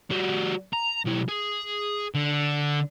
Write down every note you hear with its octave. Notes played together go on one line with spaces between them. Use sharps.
G3 F#4
A#5
B1 E4
G#4
D3